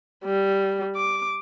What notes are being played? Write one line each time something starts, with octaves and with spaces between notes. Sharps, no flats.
G3
D6